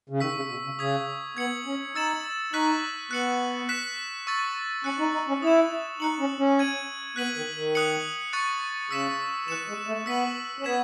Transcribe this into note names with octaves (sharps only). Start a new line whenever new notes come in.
C#3
D#3 C#6 E6 B6
C#3
B2
C#3
C#3 D#6 G#6 B6
B3 G#6 C#7 F#7
C#4
D#4 E6 A6 E7
D#4 C#6 F#6 B6 F#7
B3 F#6 C#7 F#7
F#6 B6 E7
C#6 E6 A6
C#4 F#6 C#7 F#7
D#4
D#4
C#4
E4 D#6 A6 E7
D#4 F#6 C#7 F#7
C#4
C#4
G#6 D#7 F#7
B3 F#6 B6 D#7 F#7
D#3
D#3
D#6 F#6 C#7 F#7
C#6 F#6 A6 C#7
C#3 E6 B6 E7
E3 F#6 C#7 E7
G#3
A3
B3 E6 B6 D#7 F#7
C#4
B3 G#6 B6 E7